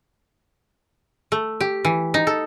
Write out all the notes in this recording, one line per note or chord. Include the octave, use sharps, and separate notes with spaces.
A3
G4
E3
D#4
A4